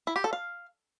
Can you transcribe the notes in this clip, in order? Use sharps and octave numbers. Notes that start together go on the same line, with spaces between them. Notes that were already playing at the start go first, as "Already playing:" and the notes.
E4
G4
A4
F5